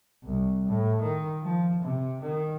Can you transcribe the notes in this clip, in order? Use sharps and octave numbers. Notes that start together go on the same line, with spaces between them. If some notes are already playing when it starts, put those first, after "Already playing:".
C2
A2
D#3
F3
C3
D#3